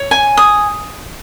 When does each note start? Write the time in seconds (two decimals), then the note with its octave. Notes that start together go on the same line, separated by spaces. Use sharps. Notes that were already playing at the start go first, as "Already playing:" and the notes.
Already playing: C#5
0.11 G#5
0.37 D#6